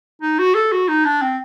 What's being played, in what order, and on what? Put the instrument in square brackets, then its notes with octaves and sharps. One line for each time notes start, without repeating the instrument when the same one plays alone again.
[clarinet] D#4
F#4
A4
F#4
D#4
D4
C4